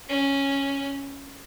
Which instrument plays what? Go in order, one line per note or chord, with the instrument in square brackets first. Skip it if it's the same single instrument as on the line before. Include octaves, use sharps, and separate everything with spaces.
[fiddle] C#4